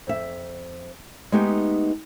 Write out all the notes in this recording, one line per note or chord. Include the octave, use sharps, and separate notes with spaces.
F2 E5
G#3 A3 B3 D#4 G4